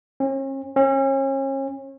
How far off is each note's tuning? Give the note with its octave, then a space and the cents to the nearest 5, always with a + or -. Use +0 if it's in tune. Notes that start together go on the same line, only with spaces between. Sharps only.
C#4 -40
C#4 -35